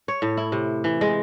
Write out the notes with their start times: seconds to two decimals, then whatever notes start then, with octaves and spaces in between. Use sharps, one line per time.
0.08 C#5
0.22 A2
0.37 E4
0.52 C3
0.84 E3
1.01 G#3